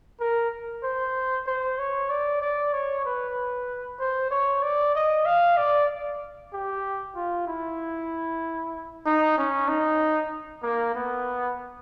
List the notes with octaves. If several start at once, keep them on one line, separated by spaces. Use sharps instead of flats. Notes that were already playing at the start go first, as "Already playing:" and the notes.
A#4
C5
C5
C#5
D5
D5
C#5
B4
C5
C#5
D5
D#5
F5
D5
G4
F4
E4
D#4
C#4
D#4
A#3
B3